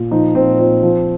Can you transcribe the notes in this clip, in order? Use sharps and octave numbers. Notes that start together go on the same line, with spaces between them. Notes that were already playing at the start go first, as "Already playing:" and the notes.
Already playing: A#2
F3 D#4
A#2 C4
A#2 C4
F3